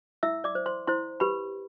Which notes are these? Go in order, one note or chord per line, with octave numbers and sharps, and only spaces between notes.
E4 E5 E6
D5 D6
C5
C5 C6
E4 C5 C6
G4 B4 B5